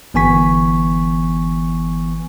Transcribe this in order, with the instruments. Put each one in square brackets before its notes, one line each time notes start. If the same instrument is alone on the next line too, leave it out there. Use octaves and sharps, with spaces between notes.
[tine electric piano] G1 E3 B3 G#5 C#6 B6